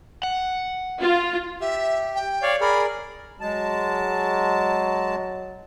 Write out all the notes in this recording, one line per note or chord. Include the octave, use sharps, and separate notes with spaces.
F#5
F4
G4 E5
G5
C#5 D5 F5
G#4 A#4 D5 B5
F#3 G#3 A5